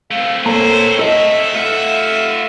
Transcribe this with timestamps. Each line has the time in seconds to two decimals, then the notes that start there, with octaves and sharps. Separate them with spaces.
0.11 A3 C4 F5
0.46 A#2 A#3 A4 C5 C#5 A#5
0.99 A4 D#5 E5
1.54 A3 F4 F#5